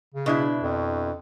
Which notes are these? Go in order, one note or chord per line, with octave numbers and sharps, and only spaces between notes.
C#3
B2 D4 E4
F2